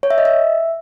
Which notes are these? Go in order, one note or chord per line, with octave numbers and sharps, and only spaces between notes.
C#5
E5
D#5
E5